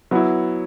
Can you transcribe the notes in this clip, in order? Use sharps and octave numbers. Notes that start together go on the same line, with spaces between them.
F#3 B3 E4